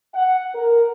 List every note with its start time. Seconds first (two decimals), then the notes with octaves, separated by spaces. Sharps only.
0.14 F#5
0.55 A#4